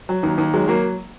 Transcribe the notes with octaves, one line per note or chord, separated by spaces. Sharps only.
F#3
D#2
D#2
F#3 G#3
F#3 A#3